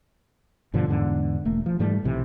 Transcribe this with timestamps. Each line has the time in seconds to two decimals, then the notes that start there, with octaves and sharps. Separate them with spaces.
0.74 G2 B2 D3 F3
0.89 E2 G#2 D3 B3
1.45 E1 A3 A#3
1.66 F3
1.79 G#2 E3 G3 A3
2.04 B1 C3 E3